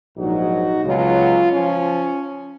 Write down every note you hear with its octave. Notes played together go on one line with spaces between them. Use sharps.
A#1 G#2 F#3 D#4 F#4
C#2 B2 F#3 C#4 F4
F3 C#4